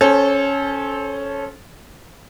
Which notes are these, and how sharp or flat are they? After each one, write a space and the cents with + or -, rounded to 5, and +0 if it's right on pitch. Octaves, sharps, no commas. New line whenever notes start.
C#4 +0 A4 -20 C5 +20